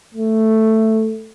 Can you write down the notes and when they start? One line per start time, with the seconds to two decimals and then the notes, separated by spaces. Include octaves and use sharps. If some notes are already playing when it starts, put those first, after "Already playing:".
0.14 A3